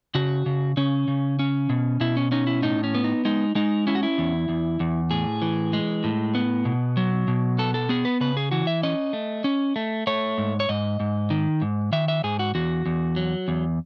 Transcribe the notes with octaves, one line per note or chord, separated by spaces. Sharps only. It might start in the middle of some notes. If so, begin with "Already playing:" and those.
C#3 F#4
C#3
C#3 C#4
C#3
C#4
B2
B2 E4
C#4
C#4 D#4
E4
A2 D#4
C#4
B3
D#4
G#3 D#4
G#3 D#4
C#4 E4
F#4
E4
E2
E2
E2
A2 G#4
E3
G#3
A2
B3
B2
F#3
B2
B3 A4
A4
B3 G#4
B4
C#3 B4
G#4
E3 F#4
E5
C#4 D#5
A3
C#4
A3
A3 C#5
G#2
C#5
G#2 D#5
G#2
D#3
G#2
D#3 E5
E5
G#2 G#4
F#4
E2 F#4
E2
F#3
E2